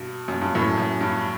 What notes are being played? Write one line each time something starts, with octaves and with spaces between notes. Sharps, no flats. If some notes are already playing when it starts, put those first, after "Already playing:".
Already playing: G2 B2
F#2
G2
F#2 A2
F#2
G2